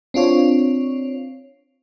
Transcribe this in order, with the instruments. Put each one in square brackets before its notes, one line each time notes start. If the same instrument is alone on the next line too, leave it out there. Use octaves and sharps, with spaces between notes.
[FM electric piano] C4 D4 F4 C#5